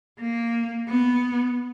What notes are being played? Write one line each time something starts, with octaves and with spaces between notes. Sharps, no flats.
A#3
B3